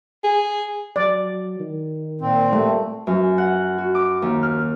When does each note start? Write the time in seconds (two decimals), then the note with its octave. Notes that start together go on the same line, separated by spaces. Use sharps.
0.24 G#4
0.96 F#3 D5
1.60 D#3
2.21 A#2 C4
2.53 G3 A3
3.07 F#2
3.38 F#5
3.78 F#4
3.95 D6
4.22 D#2
4.43 F6